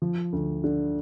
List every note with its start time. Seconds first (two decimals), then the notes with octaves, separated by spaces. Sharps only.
0.02 F3
0.33 D2
0.64 D3